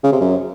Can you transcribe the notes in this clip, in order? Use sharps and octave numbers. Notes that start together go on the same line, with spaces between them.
C#3
C3
F#2